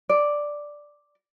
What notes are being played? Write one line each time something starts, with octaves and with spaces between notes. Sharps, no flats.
D5